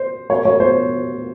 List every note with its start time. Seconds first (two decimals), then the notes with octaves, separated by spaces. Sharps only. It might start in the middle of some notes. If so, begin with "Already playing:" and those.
Already playing: C5
0.30 C#5
0.45 C#5
0.60 C5